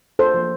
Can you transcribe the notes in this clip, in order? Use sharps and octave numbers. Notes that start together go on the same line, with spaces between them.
A4 C5
F3 A#3